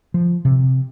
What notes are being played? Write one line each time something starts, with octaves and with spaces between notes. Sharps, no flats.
F3
C3